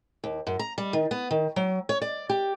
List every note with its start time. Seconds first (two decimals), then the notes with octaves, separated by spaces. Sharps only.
0.24 D#2
0.47 F#2
0.59 A#5
0.78 G3
0.93 D#3
1.11 B3
1.31 D#3
1.56 F#3
1.89 C#5
2.02 D5
2.29 G4